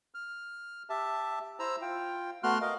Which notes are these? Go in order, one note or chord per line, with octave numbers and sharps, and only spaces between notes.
F6
G4 E5 A5
E4 C5 A#5 E6
F4 G5
A3 B3 F#4 C6 F6 F#6
A#4 D#5 F5